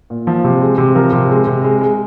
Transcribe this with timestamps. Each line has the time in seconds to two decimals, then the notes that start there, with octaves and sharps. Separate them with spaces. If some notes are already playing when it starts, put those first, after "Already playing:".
0.10 A#2
0.27 F3
0.44 C3
0.61 G#3
0.78 C3
0.95 F3 A#4
1.13 C3
1.30 G#3
1.47 C3
1.64 G#3
1.81 G#3